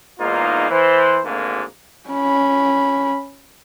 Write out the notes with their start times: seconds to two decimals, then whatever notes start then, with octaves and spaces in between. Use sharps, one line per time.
0.20 E2 G#2 A#3 D#4 F4
0.71 E3 C5
1.25 G#1 D2 G#2 A#3
2.10 C#4 B5